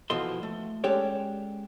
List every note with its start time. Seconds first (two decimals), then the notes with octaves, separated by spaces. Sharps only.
0.10 B2 E3 F3 A4 D#5 C6
0.43 A3
0.84 G#3 C#4 G4 A4 C#5 D5